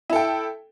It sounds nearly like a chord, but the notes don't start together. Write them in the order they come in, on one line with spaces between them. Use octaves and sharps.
E4 A4 G5